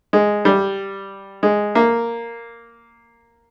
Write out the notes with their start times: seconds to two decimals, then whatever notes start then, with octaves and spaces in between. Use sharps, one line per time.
0.13 G#3
0.45 G3
1.43 G#3
1.75 A#3